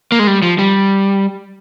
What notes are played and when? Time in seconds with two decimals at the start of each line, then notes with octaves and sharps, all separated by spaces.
0.12 A#3
0.19 G#3
0.27 G3
0.42 F3
0.59 G3